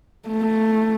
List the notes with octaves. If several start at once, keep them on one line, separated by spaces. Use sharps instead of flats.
A3